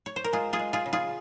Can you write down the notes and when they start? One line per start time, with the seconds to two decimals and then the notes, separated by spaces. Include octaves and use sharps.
0.06 C#5
0.16 C5
0.24 A#4
0.33 G#3 F4 G#4
0.53 F4 G#4
0.59 G#3
0.73 F4 G#4
0.86 C#3
0.93 F4 G#4